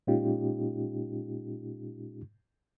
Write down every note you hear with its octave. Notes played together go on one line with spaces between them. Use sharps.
A#2 G#3 C#4 D#4 F4 G4